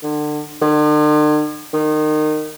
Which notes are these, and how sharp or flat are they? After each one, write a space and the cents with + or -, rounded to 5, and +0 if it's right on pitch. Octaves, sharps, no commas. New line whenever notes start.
D3 +30
D3 +45
D#3 -25